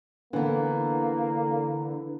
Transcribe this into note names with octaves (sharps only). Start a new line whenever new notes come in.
D3 E3 A#3 B3